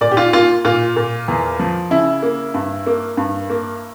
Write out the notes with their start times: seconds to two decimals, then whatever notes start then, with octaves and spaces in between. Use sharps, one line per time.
0.01 A#2 D5
0.11 G4
0.17 F4
0.33 A#3 F4
0.65 A#2 F4
0.96 A#2
1.28 E2
1.60 F3
1.90 C#3 E4
2.23 A#3
2.54 G2
2.86 A#3
3.17 G2
3.50 A#3